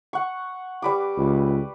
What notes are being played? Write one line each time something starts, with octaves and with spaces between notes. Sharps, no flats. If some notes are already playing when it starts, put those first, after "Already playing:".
F#5 C#6
G3 B4 D6
C#2